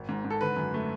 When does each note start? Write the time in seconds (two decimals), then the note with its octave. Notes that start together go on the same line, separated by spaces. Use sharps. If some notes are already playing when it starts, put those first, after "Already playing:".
Already playing: G#1
0.09 G#2
0.25 G#2
0.30 A4
0.41 D3 B4
0.57 F#2
0.74 A3